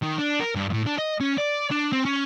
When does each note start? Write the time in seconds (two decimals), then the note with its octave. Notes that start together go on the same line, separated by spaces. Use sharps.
0.03 D#3
0.19 D4
0.40 A#4
0.55 G2
0.73 A2
0.87 D4
0.98 D#5
1.21 C#4
1.38 D5
1.71 D4
1.92 C4
2.05 C#4